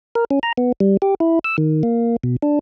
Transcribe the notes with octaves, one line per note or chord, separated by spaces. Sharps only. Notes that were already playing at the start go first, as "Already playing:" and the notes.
A#4
C#4
A#5
B3
G3
G4
E4
E6
D#3
A#3
B2
D4